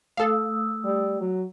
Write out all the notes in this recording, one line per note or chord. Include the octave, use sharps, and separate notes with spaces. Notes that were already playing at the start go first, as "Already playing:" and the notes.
A3 A4 F5 D#6 E6
G3
F#3